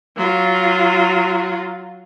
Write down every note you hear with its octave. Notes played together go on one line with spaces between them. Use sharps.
F#3 F4